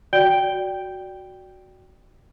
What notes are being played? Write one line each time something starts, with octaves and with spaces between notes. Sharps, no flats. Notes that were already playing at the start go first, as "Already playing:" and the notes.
F#4 D5 G5 G6 D7 G7